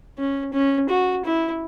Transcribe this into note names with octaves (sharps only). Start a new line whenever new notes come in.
C#4
C#4
F#4
E4